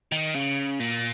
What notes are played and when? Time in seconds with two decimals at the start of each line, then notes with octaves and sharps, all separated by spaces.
0.12 D#3
0.35 C#3
0.80 A#2